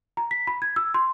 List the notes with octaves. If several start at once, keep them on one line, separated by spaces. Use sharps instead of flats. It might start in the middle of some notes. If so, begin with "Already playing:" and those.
A#5
B6
B5
G#6
E6
C6